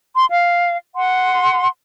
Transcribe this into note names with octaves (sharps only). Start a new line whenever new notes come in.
C6
F5
F#5 C6